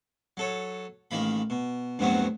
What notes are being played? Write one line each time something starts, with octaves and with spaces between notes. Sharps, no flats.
F#3 A4 C#5
A1 D#3 A#3 B5
B2
D2 G2 B2 F#3 B3 C4